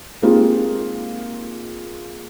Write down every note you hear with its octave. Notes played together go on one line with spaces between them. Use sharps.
G#3 A#3 C4 D#4 F4 G4